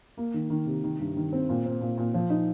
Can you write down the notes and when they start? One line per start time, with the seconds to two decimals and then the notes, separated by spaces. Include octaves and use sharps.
0.17 A#3
0.34 D#3
0.50 D#3
0.66 C3
0.84 D#3
0.99 G2
1.16 D#3
1.33 C4
1.49 A#2
1.65 C4
1.81 A#2
1.98 A#2
2.14 F3
2.30 D#4